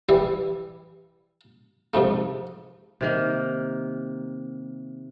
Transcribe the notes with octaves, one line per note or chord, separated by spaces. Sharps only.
E3 G3 E4
C2 F2 G#2 A3
C3 D#3 A#3